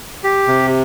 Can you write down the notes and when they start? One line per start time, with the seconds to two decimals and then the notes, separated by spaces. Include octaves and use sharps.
0.24 G4
0.47 C3